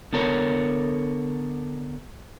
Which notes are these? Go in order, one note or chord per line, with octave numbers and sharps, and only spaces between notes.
D3 B3 A4 A#4 C#5